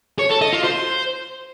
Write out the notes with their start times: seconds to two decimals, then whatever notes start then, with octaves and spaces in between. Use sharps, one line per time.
0.19 C#5
0.30 A4
0.41 D#5
0.53 F4
0.64 C5